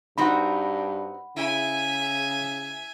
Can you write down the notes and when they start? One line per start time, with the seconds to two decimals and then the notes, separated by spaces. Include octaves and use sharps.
0.18 G2 C4 D#4 F#4 F#5 B5
1.37 C#3 E4 E5 G#5